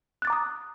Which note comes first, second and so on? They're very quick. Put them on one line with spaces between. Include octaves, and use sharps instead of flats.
F#6 A6 D6 A#5 D#6